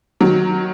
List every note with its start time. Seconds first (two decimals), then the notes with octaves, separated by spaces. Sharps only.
0.21 D#3 F#3